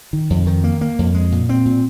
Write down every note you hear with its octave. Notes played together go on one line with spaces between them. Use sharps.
D#3
F2
D#3
A#3
A#3
F2
G#3
A#2
C4
A#2